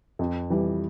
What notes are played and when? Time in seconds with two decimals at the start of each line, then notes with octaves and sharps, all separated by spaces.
0.19 F2
0.50 E3 G3